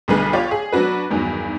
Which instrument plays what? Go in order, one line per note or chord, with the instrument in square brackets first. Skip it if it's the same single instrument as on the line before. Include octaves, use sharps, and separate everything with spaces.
[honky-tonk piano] B1 D3 G3 G#4 B4
F4 G4 C#5 D5
G#4
F#3 B3 D4 F#4 B4
E2 G2 D#3 F#3